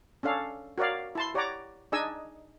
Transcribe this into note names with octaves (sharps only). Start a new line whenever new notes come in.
C#4 D4 A4 F5
F#4 A#4 C#5 D5 F5
E4 A5 C6
G4 C#5 D5 F#5 A#5 D6
D4 D#4 G#4 D#5 G#5 E6